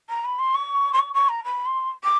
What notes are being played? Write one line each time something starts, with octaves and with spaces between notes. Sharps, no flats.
A#5
B5
C6
C#6
C6
C#6
C#6
A#5
B5
C6
D6